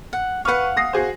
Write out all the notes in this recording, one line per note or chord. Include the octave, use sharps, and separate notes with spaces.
F#5
B4 F5 F#5 C#6
D#6 A#6 C7
F#4 G#4 C5